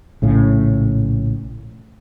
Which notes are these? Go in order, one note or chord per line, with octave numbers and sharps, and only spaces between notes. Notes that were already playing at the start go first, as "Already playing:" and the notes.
A#1 A2 C#3